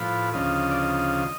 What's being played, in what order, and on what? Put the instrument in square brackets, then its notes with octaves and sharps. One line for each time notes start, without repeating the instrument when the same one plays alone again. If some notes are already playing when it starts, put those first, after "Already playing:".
Already playing: [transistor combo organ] A2 F3 B4
D2 C#3 F3 D#5
D5
D#5